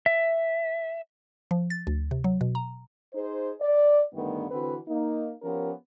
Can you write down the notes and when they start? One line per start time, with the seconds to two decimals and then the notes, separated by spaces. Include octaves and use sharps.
0.06 E5
1.51 F3
1.70 A6
1.87 D2
2.11 C3
2.24 F#3
2.41 B2
2.55 A#5
3.15 D#4 G#4 C5
3.61 D5
4.14 G2 D3 D#3 A3 B3
4.51 D3 E3 C4 F#4 B4
4.88 A#3 D#4
5.43 F3 B3 C#4 G4 A#4